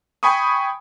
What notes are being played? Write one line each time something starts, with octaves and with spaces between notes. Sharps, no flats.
G5 G#5 B5 C#6 D#6